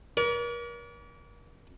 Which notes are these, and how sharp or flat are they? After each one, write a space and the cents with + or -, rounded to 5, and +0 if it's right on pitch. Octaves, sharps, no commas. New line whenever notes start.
A#4 +40 D5 -40